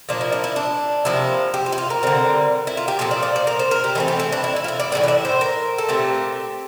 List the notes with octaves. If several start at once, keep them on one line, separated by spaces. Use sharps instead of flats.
A#2 F3 A#3 D4
E4
D4
E4
D4
C3 F3 A#3 E4
G4
F4
E4
F4
A#4
D3 G3 C4
E4
F4
G4
A#2 F3 C4 A4
D5
D5
C5
A#4
C5
A#4
G4
E3 A3 C4 A4
G4
E4
D4
E4
E4
F4
E4
D5
A2 E3 G3 A#3 D5
D5
E5
C5
A#4
A4
A#2 A3 C4 G4